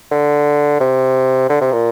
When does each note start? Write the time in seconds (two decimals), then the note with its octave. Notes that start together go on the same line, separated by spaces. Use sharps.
0.11 D3
0.80 C3
1.50 D3
1.61 C3
1.73 A#2